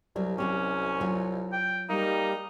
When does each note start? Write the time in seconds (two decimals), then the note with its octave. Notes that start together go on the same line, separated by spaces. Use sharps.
0.16 C2 F#3 G3
0.38 F#3 C4 C#4 G4
1.01 F#3 F4 C#5
1.52 G5
1.89 G3 A#3 D#4